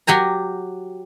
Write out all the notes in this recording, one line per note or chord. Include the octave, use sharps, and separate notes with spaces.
F#3 G4 G#5 A#5